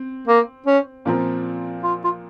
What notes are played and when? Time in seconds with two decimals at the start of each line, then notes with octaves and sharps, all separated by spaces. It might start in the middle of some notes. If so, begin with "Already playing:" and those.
Already playing: C4
0.28 A#3
0.66 C#4
1.05 A#2 F3 C4 F4 A#4
1.83 F4
2.04 F4